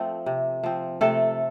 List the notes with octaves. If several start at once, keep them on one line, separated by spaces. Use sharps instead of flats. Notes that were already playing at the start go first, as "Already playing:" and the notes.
Already playing: F3 A3 C4
C3
F3 C4
C3 A3 A4